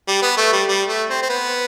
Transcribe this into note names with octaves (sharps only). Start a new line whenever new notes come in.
G3
B3
A3
G3
G3
A3
C4
C4
B3